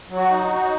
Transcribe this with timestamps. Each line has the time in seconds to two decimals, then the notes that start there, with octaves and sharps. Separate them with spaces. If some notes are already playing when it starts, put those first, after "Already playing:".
0.09 F#3
0.16 F#4
0.29 D#4
0.43 F#4
0.50 D#4